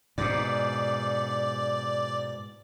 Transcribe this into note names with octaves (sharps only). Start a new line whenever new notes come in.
G#2 B2 D5